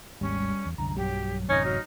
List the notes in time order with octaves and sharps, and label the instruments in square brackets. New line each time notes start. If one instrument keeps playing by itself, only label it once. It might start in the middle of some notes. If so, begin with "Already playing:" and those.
[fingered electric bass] G#1 D#2 G#2 [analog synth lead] G3 [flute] C#4
[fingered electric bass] E2
[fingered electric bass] C2 F#2 D3 [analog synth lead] A#5
[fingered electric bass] B1 G2 [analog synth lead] F#3 [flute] G4
[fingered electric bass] A1 F#2 C3 [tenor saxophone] C#4 [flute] D#4 [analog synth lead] G#6
[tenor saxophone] F#3 [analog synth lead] F6